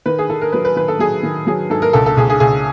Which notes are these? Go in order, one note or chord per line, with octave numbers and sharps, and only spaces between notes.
D#3 B4
G#4
D#3 A4
A#4
F#3 B4
B4
D#3 B4
A4
F#3 G#4
D#3
F#3 G#4
G#2 A4
A#4
C#2 A4
A4
C#2 G#4
G#4
C#2 G#4